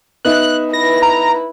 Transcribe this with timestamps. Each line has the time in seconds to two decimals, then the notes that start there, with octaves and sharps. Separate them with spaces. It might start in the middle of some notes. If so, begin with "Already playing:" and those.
0.25 B3 D#4 E5 F#6
0.73 E4 B4 A#6
1.02 A#5